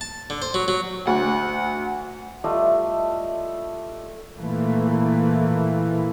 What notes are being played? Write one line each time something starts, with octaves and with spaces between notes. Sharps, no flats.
A5
D3
C5
F#3
F#3
D2 F#5
G3 A3 F4 D#5
A#2 E3 A3 A#3